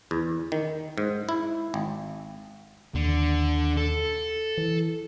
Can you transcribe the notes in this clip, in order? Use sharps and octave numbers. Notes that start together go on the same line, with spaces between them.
E2
D#3
G#2
E4
G#1
D#2 D3
A4
E3